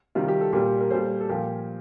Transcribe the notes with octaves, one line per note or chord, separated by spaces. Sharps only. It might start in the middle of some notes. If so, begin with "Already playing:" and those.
C3 D#3 G3 F4
G4
A4
A#2 G3 G4 A#4
A#4
A#2 G3 A4 C5
A4
A#2 F3 G4 A#4